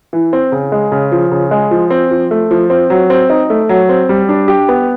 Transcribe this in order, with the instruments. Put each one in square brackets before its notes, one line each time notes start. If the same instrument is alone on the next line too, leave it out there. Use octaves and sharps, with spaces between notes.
[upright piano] E3
C4
C#3
G#3
C#3
F3
C#3
G#3
F3
C4
F3
A3
F3
C4
F#3
C4
D#4
A3
F#3
C4
G3
D4
G4
B3